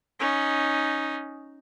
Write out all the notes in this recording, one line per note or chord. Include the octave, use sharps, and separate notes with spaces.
C#4 D#4